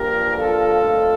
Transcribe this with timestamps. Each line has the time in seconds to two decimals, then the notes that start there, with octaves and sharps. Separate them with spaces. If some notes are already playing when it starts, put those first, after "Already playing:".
Already playing: G2 F3 A#3 D4 G4 A#4
0.37 F4 A4
0.82 F2 D3 A3 D4